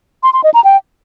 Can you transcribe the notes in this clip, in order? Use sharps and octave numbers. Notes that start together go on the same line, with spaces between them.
C6
C6
D#5
A#5
G5